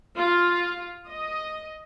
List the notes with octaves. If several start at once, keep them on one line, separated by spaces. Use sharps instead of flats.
F4
D#5